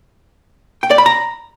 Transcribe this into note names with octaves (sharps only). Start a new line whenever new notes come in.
G5
D5
B5
A#5